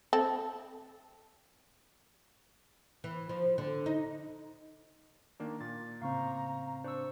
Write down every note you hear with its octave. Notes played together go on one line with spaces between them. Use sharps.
C4 A4
E3
F3
D3
D#4
D#3 A#3 D4
A#2 A6
A2 C#3 C4 F5 A#5 C#6 G6
D4 C5 C#6 E6